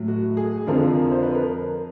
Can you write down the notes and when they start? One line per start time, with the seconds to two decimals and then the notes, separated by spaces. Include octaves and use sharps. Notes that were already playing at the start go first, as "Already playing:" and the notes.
Already playing: A2 F#3
0.08 F#4
0.37 G#4
0.67 F2 D3 F3 A#4
1.11 C5
1.23 B4
1.35 A#4